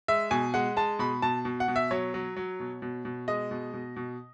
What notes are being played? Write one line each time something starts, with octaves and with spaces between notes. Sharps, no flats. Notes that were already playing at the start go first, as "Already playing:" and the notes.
G#3 E5
B2 G#5
G#3 F#5
G#3 A5
B2 B5
B2 A5
B2
F#5
B2
E5
F#3 C#5
F#3
F#3
B2
B2
B2
G#3 D#5
B2
B2
B2